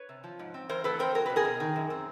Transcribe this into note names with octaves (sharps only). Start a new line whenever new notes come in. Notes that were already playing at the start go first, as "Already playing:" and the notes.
Already playing: B4 C#5
C3
F3
G#2
C4
E3 A#4 C5
A2 A4 B4
C4 A#4 C5
F#3 A#4
B2 B4
G#4 A#4
B2
D#3
F#2
C4